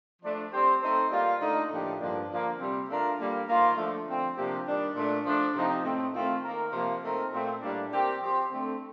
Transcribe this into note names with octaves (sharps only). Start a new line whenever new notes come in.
F3 A3 D4
G3 C4 G4 C5
A3 C4 D#4 A4 C5
G3 A#3 F4
D3 A3 D#4
A2 F3 A#3 D4 G4
G2 D3 F3 A#3 D4
D3 F3 A#3
C3 G3 C4
A3 D4 F4 A#4
D3 G3 A#3
D#3 A#3 F4 C5
D3 F3 A3
D3 F3 C4
C3 F3 A#3 D4 G4
D#3 G3 D4
A#2 A3 D4
F3 A3 D4
C3 F3 C4 D#4 G4
A2 A3 C4
D#3 A3 C4 F4
D#3 A#3 F4 A#4
C3 F3 A#3
A3 C4 D#4 A#4
A#2 A3 C4 F4
A2 G3 A#3 D4
G3 C4 G4 A#4
F3 C4 G4 C5
D3 A3 C4